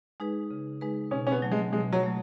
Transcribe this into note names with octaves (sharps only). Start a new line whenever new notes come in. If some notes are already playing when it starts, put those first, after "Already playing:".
G#3 D#4 G#4 B4
C#3
G#3 D#4 G#4 B4
B2 C#4
C#4
B3
F#3 A3
G#3
B2 G#3
F#3
F#3 A3